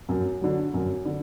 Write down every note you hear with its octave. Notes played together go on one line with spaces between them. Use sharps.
F#2
D3 F#3
F#2
D3